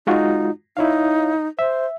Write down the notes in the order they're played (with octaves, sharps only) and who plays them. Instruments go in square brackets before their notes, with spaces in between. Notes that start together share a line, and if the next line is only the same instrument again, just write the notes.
[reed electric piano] G#3 F4 F#4 [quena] D#4
[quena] D#4 [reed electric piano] E4 C#5 F5
[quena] C5 [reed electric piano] E5